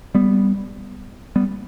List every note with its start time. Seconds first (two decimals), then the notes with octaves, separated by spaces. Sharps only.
0.15 G3 B3
1.36 G3 B3